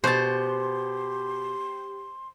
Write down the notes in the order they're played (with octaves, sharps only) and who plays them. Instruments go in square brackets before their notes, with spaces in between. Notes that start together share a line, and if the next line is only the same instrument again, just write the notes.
[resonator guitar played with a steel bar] B2 [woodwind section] G4 [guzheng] C5 A5 [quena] C6